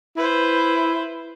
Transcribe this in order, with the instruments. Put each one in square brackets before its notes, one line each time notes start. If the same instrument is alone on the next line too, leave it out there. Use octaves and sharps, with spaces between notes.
[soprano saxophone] E4 [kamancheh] B4 C5